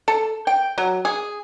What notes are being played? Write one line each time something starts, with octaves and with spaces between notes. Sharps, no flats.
A4
G5
F#3
G#4